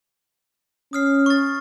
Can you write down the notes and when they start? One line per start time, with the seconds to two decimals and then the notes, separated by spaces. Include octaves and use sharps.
0.93 C#4 D#6 F6 C7
1.26 C#6 A6